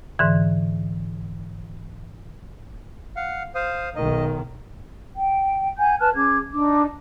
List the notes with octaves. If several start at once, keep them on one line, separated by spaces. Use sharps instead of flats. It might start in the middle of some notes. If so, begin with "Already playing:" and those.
G#2 D3 E3
F5 F#5
C5 F5 D#6
B1 D#3 D#5
G5
F#5 G#5 G6
B4 A5 F6 F#6
C#4 G#4 D6 G#6
D4 D#4 D6